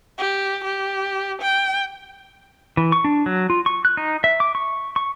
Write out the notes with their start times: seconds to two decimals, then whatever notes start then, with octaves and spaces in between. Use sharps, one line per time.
0.18 G4
0.64 G4
1.42 G5
2.77 E3
2.92 C#6
3.05 D4
3.26 F#3
3.50 F4
3.66 C#6
3.85 F#6
3.97 D#4
4.24 E5
4.40 D6
4.55 C#6
4.96 C#6